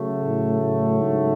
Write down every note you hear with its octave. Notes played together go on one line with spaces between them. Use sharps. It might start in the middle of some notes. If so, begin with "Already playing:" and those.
Already playing: C#3 F#3 A3
A2
A2
G#2